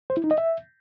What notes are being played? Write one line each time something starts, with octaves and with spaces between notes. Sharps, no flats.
C5
E4
D#4
D#5
E5